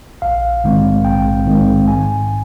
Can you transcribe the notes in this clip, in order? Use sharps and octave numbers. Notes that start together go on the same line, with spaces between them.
A#1 F5
G#2 D#3 G#3 C4
A#1 G5
G#2 D#3 G#3 C4
G#2 G#5